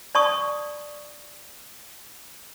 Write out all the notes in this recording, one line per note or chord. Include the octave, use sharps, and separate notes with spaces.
D5 A5 C#6 D#6